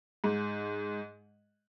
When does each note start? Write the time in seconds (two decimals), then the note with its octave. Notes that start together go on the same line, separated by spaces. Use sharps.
0.24 G#2